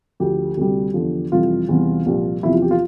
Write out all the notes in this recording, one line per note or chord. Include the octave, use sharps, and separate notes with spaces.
D2 D3 F3 G4
D2 C3 G3
E2 D3 F3
F2 C3 E3 G3 F4
E2 C3 E3 G3
C2 A#2 F3
E2 C3 F3 E4
F4
G4
F4